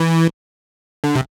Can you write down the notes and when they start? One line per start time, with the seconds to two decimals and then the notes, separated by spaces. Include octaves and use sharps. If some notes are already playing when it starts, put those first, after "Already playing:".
Already playing: E3
1.04 D3
1.15 C3